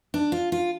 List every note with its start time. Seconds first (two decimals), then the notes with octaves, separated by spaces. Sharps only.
0.14 D4
0.32 F4
0.52 F4